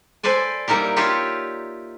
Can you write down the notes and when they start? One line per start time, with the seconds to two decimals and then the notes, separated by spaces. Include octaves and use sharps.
0.23 A4 B4 C5 D5 G#5
0.68 G3 A#3 D#4 E4 G4
0.96 D#4 F4 G4 C#5 D5 E5